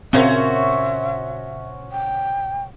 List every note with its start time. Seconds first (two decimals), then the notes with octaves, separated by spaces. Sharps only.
0.13 A#2 C#3 C4 C#4 F#4 C5 E5
1.92 G5